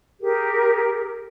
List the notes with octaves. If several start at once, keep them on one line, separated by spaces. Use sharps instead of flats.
G4 G#4 A#4